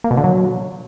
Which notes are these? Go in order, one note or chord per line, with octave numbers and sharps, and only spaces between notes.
A#3
B2
D3
F#3